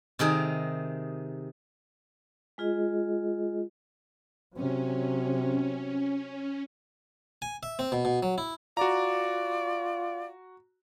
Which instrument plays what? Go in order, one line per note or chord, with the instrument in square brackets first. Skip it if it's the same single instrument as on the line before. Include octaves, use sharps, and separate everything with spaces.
[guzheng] C3 D#3 G#4 A#5
[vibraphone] G#3 F4 G#4 D#5
[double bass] C3 F#3 [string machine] C#4
[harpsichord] G#5
E5
C4
B2
B2
F#3
E4
[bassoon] F4 [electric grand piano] F#4 A#5 [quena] D5